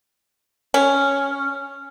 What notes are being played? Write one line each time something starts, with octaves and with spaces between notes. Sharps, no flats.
C#4